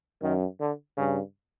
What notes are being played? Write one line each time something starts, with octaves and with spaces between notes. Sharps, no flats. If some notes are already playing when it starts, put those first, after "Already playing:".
F#2 D#3
D3
G2 C#3